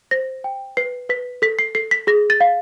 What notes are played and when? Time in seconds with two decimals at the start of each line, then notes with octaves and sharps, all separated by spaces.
0.11 C5 A#6
0.44 G5
0.77 B4 C7
1.09 B4 B6
1.42 A4 B6
1.59 C7
1.75 A4 C7
1.91 B6
2.07 G#4 A#6
2.30 A6
2.41 F5